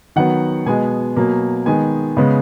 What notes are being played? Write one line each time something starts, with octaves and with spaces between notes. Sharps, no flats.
D#3 F#3 B3 F#5
B2 G#3 B3 G#5
B2 F#3 A#3
D#3 G#3 B3 G#5
C#3 G#3 B3